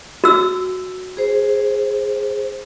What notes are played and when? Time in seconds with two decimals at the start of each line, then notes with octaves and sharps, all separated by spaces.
0.24 F#4 E6
1.17 G#4 C5